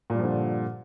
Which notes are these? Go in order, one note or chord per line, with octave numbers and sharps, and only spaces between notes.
G2 A#2 D3 F3